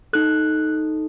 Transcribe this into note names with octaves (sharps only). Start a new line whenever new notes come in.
D#4 A4 F#6